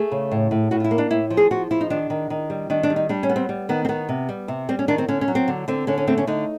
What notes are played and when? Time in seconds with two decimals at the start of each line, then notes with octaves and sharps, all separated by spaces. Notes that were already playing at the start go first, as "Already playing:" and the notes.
Already playing: A3 G#4
0.12 C#3
0.31 A2
0.51 A2
0.71 A2 F#4
0.80 F4
0.84 E4
0.91 A#3
0.98 D4
1.11 A2 E4
1.30 F3
1.37 G#4
1.51 F3 F#4
1.71 F3 E4
1.81 D#4
1.90 D#3 D4
2.10 D#3
2.30 D#3
2.50 G3
2.70 D#3 D4
2.83 D4
2.90 G3
2.96 D#4
3.09 G3 D4
3.23 C#4
3.29 B3
3.36 C4
3.49 G3
3.69 D#3 B3
3.85 C4
3.89 D#3 B3
4.09 C3
4.29 G3
4.48 C3
4.69 G3 C4
4.79 C#4
4.88 D#3 D4
4.98 C4
5.08 D3 C#4
5.21 C#4
5.28 F#3
5.35 C4
5.48 D3
5.68 D3 C4
5.87 D3 C#4
5.98 C#4
6.07 A3 C4
6.18 C#4
6.27 D3 D#4